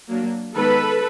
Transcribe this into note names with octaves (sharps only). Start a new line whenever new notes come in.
F#3 A#3 D4
D#3 G#3 B3 A4 B4